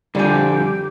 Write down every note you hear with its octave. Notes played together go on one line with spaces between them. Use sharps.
F2 D3 F3 G3 G4 G#5